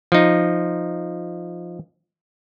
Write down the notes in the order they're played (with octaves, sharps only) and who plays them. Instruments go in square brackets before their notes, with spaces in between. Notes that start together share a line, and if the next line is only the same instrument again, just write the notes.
[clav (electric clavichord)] F3 D#4